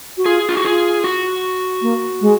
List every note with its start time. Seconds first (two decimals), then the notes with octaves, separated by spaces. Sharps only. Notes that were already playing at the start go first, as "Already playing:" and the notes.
0.17 F#4
0.26 F4 G#4
0.49 F4
0.57 F#4
0.65 F4 G#4
1.04 F#4
1.82 A#3
2.21 G#3